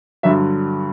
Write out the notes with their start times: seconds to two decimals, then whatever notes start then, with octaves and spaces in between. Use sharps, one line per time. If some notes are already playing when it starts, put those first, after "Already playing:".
0.23 G2 D3 F#3 E5